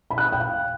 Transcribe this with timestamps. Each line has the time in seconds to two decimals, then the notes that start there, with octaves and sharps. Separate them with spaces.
0.10 B5
0.18 F#6
0.25 B5
0.32 G5
0.40 F5